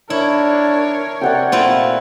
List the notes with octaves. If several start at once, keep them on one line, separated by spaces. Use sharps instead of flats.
D4 E4 A#4 C#5
C3 D5 F#5 G5
A#2 A3 C4 E4 F4